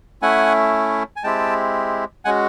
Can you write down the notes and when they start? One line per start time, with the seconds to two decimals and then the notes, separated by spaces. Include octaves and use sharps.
0.22 A3 C#4 E4 F#5 G#5
1.16 G#5
1.24 G#3 C4 E4 G4 G5 A5
2.25 G#3 C#4 F#4 F#5 G#5